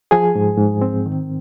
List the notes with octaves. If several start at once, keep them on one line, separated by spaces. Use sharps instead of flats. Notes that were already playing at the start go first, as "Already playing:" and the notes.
F3 G#4 G#5
G#2
G#2
C4
D#3